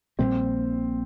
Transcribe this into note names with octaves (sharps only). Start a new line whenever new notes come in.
A#1 A#2 G3 A#3 C4